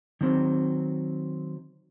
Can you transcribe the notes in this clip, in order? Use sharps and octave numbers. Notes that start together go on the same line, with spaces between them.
D#3 F#3 C4